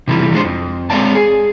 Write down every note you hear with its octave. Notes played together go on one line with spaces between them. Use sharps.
C3 E3 F3 G3
F3 G#3 D4 C5
F2
G#3 C4 C#5 D5 F5 A5
G#4